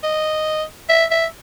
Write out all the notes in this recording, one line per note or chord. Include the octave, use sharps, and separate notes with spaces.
D#5
E5
E5